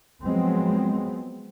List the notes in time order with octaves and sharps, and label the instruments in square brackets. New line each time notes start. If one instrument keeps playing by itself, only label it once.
[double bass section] F3 F#3 G#3 B3 C4